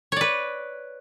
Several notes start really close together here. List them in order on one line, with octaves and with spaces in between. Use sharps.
C#5 D5 B4